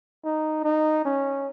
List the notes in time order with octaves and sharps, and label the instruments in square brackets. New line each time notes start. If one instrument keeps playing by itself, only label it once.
[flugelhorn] D#4
D#4
C#4